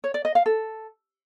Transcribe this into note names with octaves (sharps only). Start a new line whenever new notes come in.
C#5
D5
D#5
F5
A4